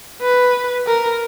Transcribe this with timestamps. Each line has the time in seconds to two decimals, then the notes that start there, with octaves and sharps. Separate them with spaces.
0.22 B4
0.87 A#4